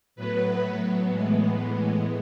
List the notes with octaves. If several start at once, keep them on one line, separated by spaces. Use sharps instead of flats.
A2 F#3 B3 B4
A2 E3 G#3 B3